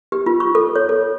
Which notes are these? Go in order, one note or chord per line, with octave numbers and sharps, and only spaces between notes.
G4
F4
C#6
A4
C#5
A4